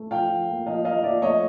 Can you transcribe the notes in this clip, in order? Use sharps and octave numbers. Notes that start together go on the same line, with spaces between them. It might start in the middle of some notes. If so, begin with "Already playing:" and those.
Already playing: A3
F3 F5 G5
F3
A#3
F3 D#5 F5
A#3 D#5 F5
F3 D5 E5
A3 C#5 D#5